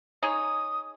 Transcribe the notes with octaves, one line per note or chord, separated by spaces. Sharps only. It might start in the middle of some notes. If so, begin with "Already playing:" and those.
D#4 G#4 C#5 D#6